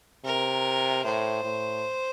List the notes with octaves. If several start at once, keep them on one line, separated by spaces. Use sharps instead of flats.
C3 A#4
A2 C5
A2